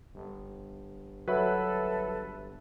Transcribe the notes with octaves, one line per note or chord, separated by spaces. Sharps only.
G1
F#3 A4 B4 E5 B5